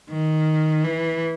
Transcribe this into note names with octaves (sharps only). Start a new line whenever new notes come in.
D#3
E3